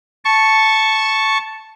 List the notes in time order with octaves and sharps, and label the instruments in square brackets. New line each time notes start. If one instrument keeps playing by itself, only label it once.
[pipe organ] A5 C#6